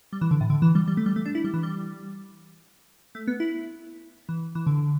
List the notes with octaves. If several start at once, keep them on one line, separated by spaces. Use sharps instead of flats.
G3
E3
D3
A2
D3
E3
G3
G3
A3
G3
A3
D4
E4
G3
E3
G3
A3
B3
E4
E3
E3
D3